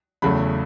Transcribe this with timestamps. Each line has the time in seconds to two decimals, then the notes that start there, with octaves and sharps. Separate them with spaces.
0.22 E2 C#3 F#3 A3 B5